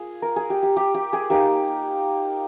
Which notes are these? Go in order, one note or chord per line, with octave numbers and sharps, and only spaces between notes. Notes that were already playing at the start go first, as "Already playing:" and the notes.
Already playing: A#3 F4 G#4
A#4
G#4
G4
G4
G4
G4
G#4
A#3 D#4 G4